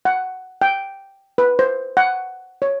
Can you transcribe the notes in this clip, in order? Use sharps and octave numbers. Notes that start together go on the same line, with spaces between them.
F#5
G5
B4
C5
F#5
C#5